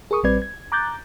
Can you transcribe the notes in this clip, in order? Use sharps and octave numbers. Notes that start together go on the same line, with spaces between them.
G#4 A#4 C#6 D#6
A#1 G3 C4 B4 D5 G#6
G#6
A#5 D6 F#6 G6 A6